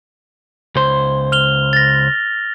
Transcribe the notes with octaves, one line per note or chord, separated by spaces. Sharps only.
C#2 C5
F6 F7 G7
A6 A#6